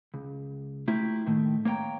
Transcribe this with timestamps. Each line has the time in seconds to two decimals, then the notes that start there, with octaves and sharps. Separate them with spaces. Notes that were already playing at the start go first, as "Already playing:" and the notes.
0.14 C#2
0.88 A3 A#3 E4 F4 G4
1.26 A2 D#3 A3
1.65 A#3 C#5 D5 G5 A#5